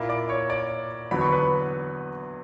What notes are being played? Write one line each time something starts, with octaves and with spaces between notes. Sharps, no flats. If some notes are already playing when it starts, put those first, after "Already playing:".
Already playing: A#2 A#3 E4
D5 D6
C#5 C#6
D5 D6
E2 D3 F#3 B3 B5
C#6
B4 B5